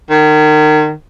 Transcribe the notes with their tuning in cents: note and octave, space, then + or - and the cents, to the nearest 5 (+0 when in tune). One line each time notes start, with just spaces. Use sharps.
D#3 -30